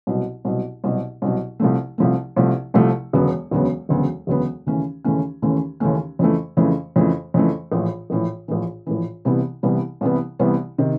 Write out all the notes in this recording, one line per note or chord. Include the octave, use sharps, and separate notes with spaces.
C2 B2 F#3
C2 B2 F#3
C2 B2 F#3
C2 B2 F#3
C2 C3 F3 A3
C2 C3 F3 A3
C2 C3 F3 A3
C2 C3 F3 A3
E1 D2 C#3 F#3 B3
E1 D2 C#3 F#3 B3
E1 D2 C#3 F#3 B3
E1 D2 C#3 F#3 B3
D#2 C#3 E3 A3 C#4
D#2 C#3 E3 A3 C#4
D#2 C#3 E3 A3 C#4
D#2 C#3 E3 A3 C#4
F2 C#3 E3 A3
F2 C#3 E3 A3
F2 C#3 E3 A3
F2 C#3 E3 A3
A#1 A2 E3
A#1 A2 E3
A#1 A2 E3
A#1 A2 E3
C2 C3 E3 G3 B3
C2 C3 E3 G3 B3
C2 C3 E3 G3 B3
C2 C3 E3 G3 B3
C3 D#3